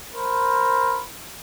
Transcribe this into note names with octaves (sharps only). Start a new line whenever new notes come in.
A#4 C5 B5